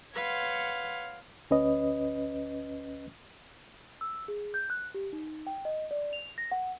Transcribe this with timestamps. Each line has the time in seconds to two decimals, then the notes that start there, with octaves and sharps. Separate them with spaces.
0.15 B4 C#5 F5 F#5 C6
1.51 D2 C#4 B4 D#5
4.01 E6
4.28 G#4
4.54 G6
4.70 F#6
4.94 G4
5.13 D#4
5.47 G5
5.65 D#5
5.91 D5
6.13 F7
6.38 A#6
6.52 F#5